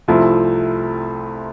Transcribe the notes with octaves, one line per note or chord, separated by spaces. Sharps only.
C2 C3 F3 A3 E4